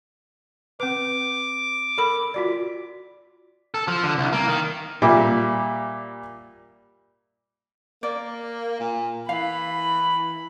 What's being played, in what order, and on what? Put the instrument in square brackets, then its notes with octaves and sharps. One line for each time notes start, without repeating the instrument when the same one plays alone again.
[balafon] C4 B4 [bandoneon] D6
[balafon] A4 A#4 B5
F4 F#4 D5
[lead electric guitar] A4
F3
D3
C2
A#3
D#3
[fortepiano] A#2 G3 E5 D6
[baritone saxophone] A#3 [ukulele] D5
[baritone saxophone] A#2
[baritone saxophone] E3 [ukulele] F5 [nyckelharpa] B5